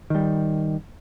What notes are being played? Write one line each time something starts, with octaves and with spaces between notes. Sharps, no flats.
D#3 G3